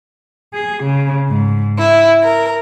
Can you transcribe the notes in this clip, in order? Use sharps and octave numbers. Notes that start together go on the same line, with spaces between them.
G#4
C#3
G#2
E4
A#4